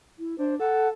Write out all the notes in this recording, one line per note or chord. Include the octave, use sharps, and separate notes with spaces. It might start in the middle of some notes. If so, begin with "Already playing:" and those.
E4
D4 C5
A4 F#5